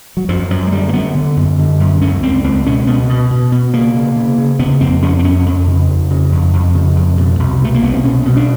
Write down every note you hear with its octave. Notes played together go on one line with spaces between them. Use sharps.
F#3
F#2 F3
F#2 F#3
G#3
D3 G3
A#3
D3 B3
D3
F#2
D3
F#2
C#2 C#4
C#2 C4
C#2 C4
B2 C#4
B2 B3
B2
B2
B2
C#3 A#3
C#3
C#3
C#3
C#3 B3
F2 C4
F2 C#4
C4
F2 C#4
F2
C#3
F2
C#3
F2
F2
C#3
F2
B2
C2
B2 A3
A#3
C2 B3
C4
B2 C#4
B2
D4